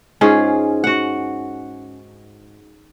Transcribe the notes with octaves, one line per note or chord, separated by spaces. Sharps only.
G#2 C#4 F4 G#4
F#4 F#5